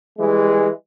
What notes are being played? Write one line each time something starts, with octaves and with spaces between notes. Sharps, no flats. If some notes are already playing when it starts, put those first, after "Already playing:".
E3 G3 G#3